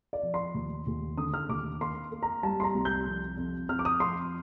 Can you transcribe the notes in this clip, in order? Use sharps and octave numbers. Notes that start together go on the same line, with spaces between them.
D5
F3
C6
D#2
D#2
D3 D#6
F6
D#2 D6
A#3 C6
A#3
A#5
G3 A5
C6
A#5
C2
G6
F2
F2
F2 F6
D6
D#6
F2 C6